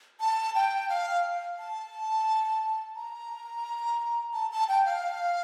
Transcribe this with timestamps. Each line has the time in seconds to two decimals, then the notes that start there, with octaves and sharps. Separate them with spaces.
0.20 A5
0.55 G5
0.89 F5
1.59 A5
2.96 A#5
4.33 A5
4.51 A5
4.68 G5
4.85 F5